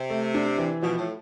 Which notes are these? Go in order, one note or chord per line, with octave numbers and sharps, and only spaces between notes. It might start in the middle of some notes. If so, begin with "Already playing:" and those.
Already playing: C3
A3
D4
E3
B2 F3
A2